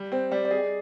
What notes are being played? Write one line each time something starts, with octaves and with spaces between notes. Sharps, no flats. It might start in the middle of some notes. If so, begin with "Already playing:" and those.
Already playing: G3
C4 C5
G3 D5
D5
G#4 D#5